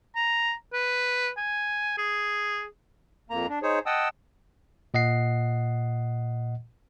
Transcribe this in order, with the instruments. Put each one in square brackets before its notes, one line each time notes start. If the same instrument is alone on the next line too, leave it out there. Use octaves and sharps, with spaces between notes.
[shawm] A#5
B4
G#5
G#4
[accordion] F2 A#3 A#5
D4
D#4 G#4 C5 C#5
D#5 F#5 G5 A5 D#6 E6
[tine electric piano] A#2 D#5 F#5 C7